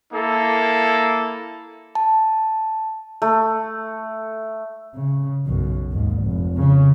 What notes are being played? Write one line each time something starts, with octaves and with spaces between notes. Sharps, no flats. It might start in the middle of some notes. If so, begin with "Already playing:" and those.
A#3 E4 A4
A5
A3
C#3
B1 F#2
D#2 G#2
F1
C#3